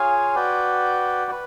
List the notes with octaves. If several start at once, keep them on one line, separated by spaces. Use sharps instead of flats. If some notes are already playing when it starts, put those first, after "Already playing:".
Already playing: F4 G#4 C#5 F5 G#5
F#4 B4 D5 G5
B4